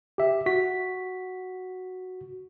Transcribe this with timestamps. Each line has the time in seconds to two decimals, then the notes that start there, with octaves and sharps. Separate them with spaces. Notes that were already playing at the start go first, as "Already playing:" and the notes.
0.18 G4 E5
0.46 F#4 B6